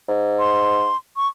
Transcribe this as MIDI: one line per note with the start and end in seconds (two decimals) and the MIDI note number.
0.09 0.89 44
0.39 0.96 84
1.16 1.28 85